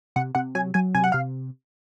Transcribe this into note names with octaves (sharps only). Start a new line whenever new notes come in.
C3 F#5
C3 F#5
F#3 G#5
F#3 G#5
C3 G#5
F#5
C3 F5